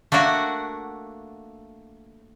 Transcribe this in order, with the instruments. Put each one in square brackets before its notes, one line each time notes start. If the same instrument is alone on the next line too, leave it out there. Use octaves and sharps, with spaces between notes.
[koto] A3 A#3 D4 F#4 F#5